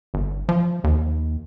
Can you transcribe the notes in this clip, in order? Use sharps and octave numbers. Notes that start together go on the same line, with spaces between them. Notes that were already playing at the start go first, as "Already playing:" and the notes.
G1
F3
D#2